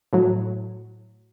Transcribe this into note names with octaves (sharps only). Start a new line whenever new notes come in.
A2 F#3